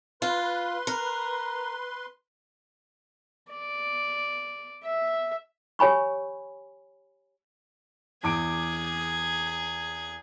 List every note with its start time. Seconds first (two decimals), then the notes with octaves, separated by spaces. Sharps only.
0.22 F4 B4 C6
0.87 A#4
3.50 D5
4.84 E5
5.79 G4 C#5 G#5 B5 C#6
8.23 E2 G#4 D6 G#6 D7